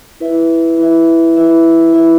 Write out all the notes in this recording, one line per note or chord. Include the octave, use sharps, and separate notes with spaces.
E4 B4 E5
E4 B4 E5
E4 B4 E5
E4 B4 E5